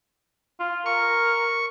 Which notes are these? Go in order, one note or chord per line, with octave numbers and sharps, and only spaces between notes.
F4
A#4 C#6